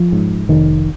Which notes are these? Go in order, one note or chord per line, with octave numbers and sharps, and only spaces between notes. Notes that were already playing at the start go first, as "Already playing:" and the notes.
Already playing: F3
G#2
F1 D#3